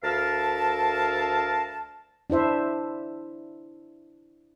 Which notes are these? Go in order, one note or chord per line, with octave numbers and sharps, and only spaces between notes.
D2 A#4 E5 F5 A5
D4 E4 C5 E5